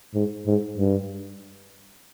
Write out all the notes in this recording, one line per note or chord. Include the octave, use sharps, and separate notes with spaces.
G#2
G#2
G2